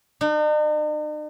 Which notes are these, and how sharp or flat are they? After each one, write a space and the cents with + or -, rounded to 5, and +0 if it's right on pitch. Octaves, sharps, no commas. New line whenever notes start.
D#4 -45